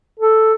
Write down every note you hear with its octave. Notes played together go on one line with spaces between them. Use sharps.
A4